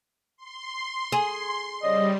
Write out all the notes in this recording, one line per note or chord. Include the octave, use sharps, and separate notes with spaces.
C6
G#4
C#3 G3 D5 D#5